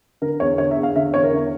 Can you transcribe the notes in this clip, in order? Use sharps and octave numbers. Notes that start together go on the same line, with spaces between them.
D3 A#4
E2 C#5
D3 C#5
E5
E2
F5
D3 E5
E2 C#5
A#4
D3